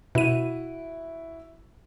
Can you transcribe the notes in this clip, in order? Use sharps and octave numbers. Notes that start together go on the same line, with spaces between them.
B2 E4 F#4 D#7